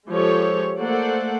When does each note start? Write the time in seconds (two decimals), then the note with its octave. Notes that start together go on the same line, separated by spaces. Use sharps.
0.10 F3 G#3 G4 A4 C#5
0.80 A3 A#3 A4 C5 D5 F#5